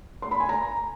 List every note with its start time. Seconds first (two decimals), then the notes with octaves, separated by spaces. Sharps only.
0.22 C6
0.31 B5
0.40 G#5
0.49 A#5